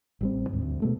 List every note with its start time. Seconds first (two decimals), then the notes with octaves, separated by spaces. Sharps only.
0.21 A1 G3 C4
0.49 D#2 G#2
0.62 D2
0.82 B2 G#3 A3